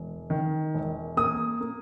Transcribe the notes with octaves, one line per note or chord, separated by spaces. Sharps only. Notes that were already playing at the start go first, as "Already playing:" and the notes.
Already playing: E1
D#3
E1
A#3 D#6
A#3